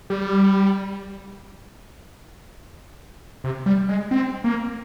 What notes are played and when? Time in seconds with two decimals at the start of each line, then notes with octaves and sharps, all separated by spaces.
0.10 G3
3.44 C3
3.66 G3
3.89 G#3
4.11 C4
4.44 A#3